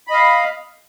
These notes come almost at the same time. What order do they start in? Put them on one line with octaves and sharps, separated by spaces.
B5 D#5 F5